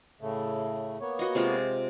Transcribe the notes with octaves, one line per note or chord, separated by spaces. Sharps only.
A2 C#3 A3
A#3 B3 C#5
F#4 D#5
C3 G#3 F4